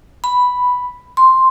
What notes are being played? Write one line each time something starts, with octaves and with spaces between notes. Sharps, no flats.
B5
C6